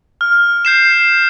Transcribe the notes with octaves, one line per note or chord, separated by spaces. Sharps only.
F6
G6 C7 E7